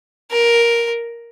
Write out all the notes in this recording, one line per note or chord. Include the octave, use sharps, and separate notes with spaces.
A#4